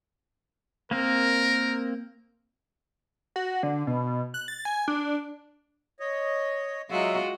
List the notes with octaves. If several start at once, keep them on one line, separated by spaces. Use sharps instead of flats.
A#3 C4 A#4
F#4
D3
B2
F#6
A6
G#5
D4
C#5 D#5
F#3 G#3 D#4 F4 F#4 E5